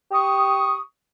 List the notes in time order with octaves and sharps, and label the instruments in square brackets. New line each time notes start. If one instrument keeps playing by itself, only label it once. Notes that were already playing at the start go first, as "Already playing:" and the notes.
[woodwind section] G4 C#6 D#6